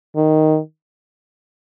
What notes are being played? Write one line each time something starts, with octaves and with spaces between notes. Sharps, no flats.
D#3